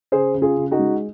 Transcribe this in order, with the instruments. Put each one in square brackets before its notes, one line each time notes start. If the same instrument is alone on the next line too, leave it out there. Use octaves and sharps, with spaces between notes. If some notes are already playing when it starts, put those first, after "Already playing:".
[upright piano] C#3 G#4 C5
C#3
F4 G#4
C#3
D#4 F#4
G#3